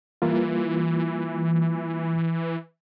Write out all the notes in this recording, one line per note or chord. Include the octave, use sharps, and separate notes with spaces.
E3 G3 A#3 F4